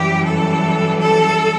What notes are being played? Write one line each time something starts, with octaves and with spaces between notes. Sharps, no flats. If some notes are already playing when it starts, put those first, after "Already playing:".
Already playing: F#2 E3 G3 G4
A4
A4